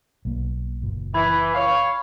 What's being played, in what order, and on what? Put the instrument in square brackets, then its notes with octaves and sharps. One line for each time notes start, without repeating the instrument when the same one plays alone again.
[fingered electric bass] B1 A#3
F#1 A#2
[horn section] E3 [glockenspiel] B5 G#6
[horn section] C#5 F5